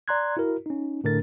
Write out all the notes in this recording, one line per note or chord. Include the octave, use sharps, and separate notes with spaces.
D5 A#5 C6 F#6 G#6
E4 F#4 A#4
C#4 D#4
A2 D3 A3 D4 A#4 A6